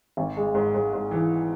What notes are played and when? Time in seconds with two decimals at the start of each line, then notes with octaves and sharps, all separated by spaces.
0.17 G#1
0.37 G#3
0.55 G#2
0.74 G#2
0.93 G#2
1.11 E3